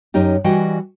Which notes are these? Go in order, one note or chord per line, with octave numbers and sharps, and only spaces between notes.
F#2 C#4 D#4 G4
E3 G3 F#4 D#5 G5 G#5